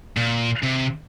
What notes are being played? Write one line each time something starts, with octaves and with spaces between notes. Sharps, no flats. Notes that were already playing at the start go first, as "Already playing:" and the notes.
A#2
C3